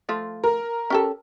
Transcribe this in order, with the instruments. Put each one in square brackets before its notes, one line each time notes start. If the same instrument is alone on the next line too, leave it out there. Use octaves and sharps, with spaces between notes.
[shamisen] F3 A3 F4
[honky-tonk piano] A#4
[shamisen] C#4 G4 A4